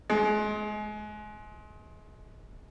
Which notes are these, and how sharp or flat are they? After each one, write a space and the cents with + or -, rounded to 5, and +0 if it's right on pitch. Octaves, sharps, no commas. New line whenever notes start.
G#3 +30